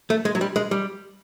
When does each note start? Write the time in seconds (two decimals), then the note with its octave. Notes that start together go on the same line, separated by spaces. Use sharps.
0.10 A3
0.25 G#3
0.35 F#3
0.41 G3
0.56 G#3
0.71 G3